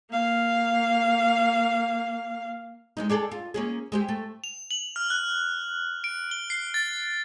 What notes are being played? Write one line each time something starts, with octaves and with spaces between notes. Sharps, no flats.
A#3 F5
G#3 B3 D#4
D4 G#4 A4
F4
A#3 C#4 G#4
G#3 C4 G4
A3
F7
F#7
F6
F#6
D7
G7
C7
A6